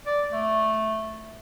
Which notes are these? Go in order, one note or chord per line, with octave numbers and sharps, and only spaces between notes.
D5
A3